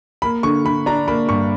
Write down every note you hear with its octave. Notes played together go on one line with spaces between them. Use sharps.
A#3 B5
D3 C#6
D3 B5
D4 A#5
A#3 B5
G2 C#6